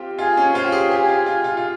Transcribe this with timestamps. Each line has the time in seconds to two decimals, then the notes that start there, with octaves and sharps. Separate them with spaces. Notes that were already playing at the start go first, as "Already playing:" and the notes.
Already playing: C4 F4 G4
0.18 F4 G#4
0.37 C#4
0.55 F4 C5
0.64 G4
0.72 G#4
0.91 G4 G#4
1.09 F4
1.26 F4
1.44 F4
1.57 F4